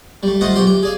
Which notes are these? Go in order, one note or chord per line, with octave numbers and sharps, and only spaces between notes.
G3 A3
A3 F4 C5 D#5 F#5
B1 F3 G4 C6
G4
G#4 D5 F5